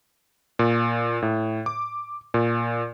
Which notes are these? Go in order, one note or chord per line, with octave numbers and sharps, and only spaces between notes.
A#2
A2
D6
A#2